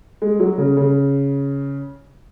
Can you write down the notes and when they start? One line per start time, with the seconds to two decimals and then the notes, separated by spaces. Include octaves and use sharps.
0.22 G#3
0.40 F#3
0.58 C#3
0.77 C#3